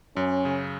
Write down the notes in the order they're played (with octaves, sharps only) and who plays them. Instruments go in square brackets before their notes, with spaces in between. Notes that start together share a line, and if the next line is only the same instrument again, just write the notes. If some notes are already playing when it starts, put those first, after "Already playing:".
[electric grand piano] F#2 [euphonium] C#4
[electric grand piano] C#3